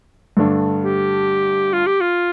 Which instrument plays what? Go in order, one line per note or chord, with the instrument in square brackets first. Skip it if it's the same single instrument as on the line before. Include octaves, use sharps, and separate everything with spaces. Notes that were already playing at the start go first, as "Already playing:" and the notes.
[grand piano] G2 D3 A3 D4
[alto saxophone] G4
F4
G4
F4